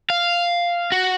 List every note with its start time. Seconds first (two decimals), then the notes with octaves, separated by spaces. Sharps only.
0.10 F5
0.92 F#4